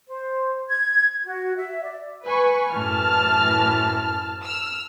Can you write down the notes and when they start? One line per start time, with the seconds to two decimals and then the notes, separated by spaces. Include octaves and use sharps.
0.08 C5
0.68 G#6
1.24 F#4
1.56 E5
1.84 D5
2.26 B4 G#5 C#6
2.74 F#2 A2 E3 A5 F6
4.43 E6 F6